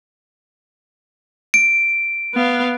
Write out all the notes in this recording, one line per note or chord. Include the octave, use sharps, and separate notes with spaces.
D7
B3 F5